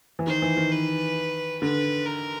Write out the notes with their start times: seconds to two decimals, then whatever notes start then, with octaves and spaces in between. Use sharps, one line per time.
0.19 E3
0.27 D#3 C5
0.42 E3
0.57 D#3
0.72 B4
1.62 D3 B4
2.06 A#4